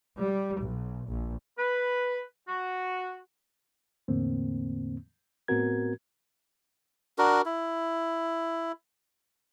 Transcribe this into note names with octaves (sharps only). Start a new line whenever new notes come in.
G3
B1
A#1
B4
F#4
E2 A2 D3 A#3 C4
A2 B3 C4 F#4 A#4 G#6
D4 F#4 A#4
E4